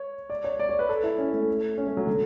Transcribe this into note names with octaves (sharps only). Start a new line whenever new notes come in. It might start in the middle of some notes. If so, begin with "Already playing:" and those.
Already playing: C#5
D5
C#5
D5
C#5
B4
A4
E4
C#4
A3
C#4
A3
F#3
D3